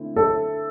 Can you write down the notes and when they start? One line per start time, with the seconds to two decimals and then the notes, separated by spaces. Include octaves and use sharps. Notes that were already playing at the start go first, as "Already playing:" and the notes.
Already playing: D3 A3 C4 E4
0.16 A4